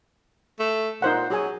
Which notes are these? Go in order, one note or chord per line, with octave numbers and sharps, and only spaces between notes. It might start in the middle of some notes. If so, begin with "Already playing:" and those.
A3
A#2 D#4 C5 F#5
F#3 F#4 G#4 G#5